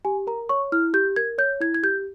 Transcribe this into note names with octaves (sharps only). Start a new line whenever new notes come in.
G4 G#5
A#4 A#5
C#5 C#6
E4 F6
G4 G6
A#4 G#6
C#5 G6
E4 G#6
G#6
G4 G6